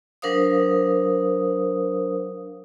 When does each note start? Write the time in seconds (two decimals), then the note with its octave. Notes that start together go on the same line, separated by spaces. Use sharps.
0.22 F#3 D4 A#4 C5 F5 D#6